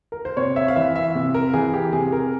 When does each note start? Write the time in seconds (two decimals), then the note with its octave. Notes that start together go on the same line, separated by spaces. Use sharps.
0.12 A#4
0.25 C5
0.37 C3 C#5
0.56 E5
0.68 F5
0.76 E3 E5
0.95 E5
1.15 C3
1.34 A#4
1.53 E3 G#4
1.74 G4
1.92 C3 G#4
2.12 A#4